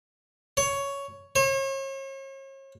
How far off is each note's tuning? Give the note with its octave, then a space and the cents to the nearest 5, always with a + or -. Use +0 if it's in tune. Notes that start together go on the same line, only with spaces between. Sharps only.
C#5 +10
C#5 -40